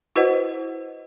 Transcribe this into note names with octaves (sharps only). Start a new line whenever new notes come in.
E4 F#4 B4 C5 D#5 F#5